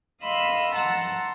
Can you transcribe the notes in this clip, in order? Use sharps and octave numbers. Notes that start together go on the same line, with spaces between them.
D#5 F5 B5 C6 E6
F#5 A5 A#5 C6 E6